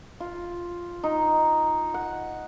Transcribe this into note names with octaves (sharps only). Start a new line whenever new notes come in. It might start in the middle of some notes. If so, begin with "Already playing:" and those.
F4
D#4
F#5